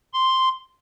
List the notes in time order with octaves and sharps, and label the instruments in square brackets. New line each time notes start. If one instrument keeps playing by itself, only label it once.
[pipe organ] C6